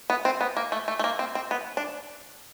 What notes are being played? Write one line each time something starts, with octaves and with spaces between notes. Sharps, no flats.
B3
C4
B3
A#3
A3
A3
A3
A#3
C4
C4
B3
D4